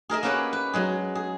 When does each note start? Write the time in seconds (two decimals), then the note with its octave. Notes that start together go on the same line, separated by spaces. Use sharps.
0.10 G#4 A#4 D#5 E5
0.23 A#3 C#4 G4 B4 C#5 F#5
0.53 B4
0.73 F#3 G#3 G#4
1.15 G#4